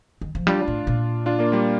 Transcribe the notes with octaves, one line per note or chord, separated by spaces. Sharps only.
D#3
F3
G3 D4 F4
A2
A#2
D4 F4
A#3 D4
G3 A#3